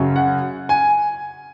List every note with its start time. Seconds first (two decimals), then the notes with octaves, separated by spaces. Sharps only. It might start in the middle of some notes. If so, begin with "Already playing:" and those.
Already playing: F#2 C#3 F#3 C#4
0.16 F#5
0.69 G#5